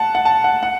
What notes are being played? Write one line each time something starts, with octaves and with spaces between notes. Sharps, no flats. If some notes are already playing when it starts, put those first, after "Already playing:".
Already playing: F#5 A5
F#5
A5
F#5
F#5